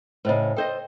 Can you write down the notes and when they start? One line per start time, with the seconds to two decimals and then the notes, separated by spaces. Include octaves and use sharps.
0.25 A2 C#3 B4 C5 D#5
0.57 A4 C5 D#5 G5